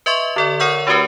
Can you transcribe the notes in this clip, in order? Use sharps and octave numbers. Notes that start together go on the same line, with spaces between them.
B4 D#5 E5 C6 C#6
D3 A4 D5
A#4 C#5 F#5 C#6 E6 G6
A3 D4 F#4 G4 A#4 B4